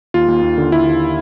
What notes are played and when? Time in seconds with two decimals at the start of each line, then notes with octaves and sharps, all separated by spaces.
0.14 D#2 F4
0.28 D#2
0.43 D#2
0.58 D3
0.72 D3 E4
0.87 D#2